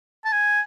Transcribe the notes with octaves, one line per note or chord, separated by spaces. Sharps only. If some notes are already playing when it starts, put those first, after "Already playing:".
A5
G#5